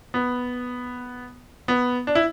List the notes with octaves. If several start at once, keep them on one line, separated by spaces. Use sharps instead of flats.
B3
B3
D4
E4